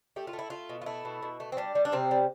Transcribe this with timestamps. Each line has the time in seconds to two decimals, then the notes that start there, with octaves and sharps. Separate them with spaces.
0.16 A3 G4
0.27 F4
0.33 A3
0.39 E4
0.50 A3 F4
0.69 B2
0.82 F4
0.86 A3 E4
1.05 B2
1.23 B2
1.40 A3
1.52 C4
1.57 G3 D4
1.75 G3
1.85 D4
1.92 C3 C4
2.11 G3